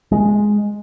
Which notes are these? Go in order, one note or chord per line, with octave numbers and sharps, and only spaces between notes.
G#3